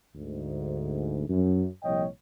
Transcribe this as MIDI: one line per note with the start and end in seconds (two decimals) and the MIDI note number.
0.15 1.23 38
0.15 1.23 44
1.29 1.65 42
1.83 2.06 36
1.83 2.06 46
1.83 2.06 53
1.83 2.06 73
1.83 2.06 75
1.83 2.06 79